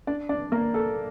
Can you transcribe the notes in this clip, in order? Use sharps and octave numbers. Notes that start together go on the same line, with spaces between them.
D4 D5
D4 D5
A#3 A#4
A4